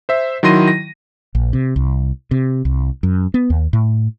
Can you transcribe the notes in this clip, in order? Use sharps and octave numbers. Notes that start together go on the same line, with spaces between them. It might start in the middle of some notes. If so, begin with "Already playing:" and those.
C5 E5
D#3 F#3 E4 C6 A#6 D#7
A#6
A#1
C3
C2
C3
C2
F#2
B3
D#2
A2